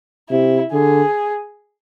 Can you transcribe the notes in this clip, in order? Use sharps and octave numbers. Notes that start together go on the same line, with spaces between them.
C3 E4
D3 G#4